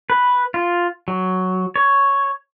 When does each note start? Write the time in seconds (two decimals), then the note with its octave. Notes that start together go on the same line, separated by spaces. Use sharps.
0.10 B4
0.54 F4
1.08 F#3
1.76 C#5